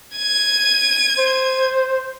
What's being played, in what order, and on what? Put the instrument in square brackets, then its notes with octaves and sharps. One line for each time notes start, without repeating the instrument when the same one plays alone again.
[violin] G#6 D#7
[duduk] C5